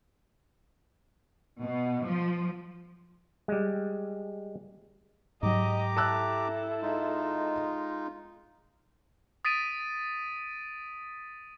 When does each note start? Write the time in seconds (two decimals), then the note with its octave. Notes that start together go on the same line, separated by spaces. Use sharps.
1.63 B2
2.05 F3
3.48 G3 G#3
5.43 G#2 F#3 G4 D#5 A#5 D6
5.97 E4 A4 A5 E6 F#6
6.82 G#3 D#4 F4
9.45 D#6 A6 B6 D7 D#7